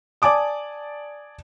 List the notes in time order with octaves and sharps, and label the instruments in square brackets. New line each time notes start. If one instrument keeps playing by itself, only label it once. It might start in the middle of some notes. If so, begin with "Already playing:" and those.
[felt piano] D5 G#5 A5 D6 D#6